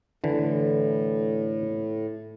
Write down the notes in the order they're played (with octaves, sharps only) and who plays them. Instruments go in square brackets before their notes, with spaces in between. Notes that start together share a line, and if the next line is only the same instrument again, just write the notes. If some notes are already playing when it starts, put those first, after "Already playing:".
[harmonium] A2 [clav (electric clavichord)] D3 E3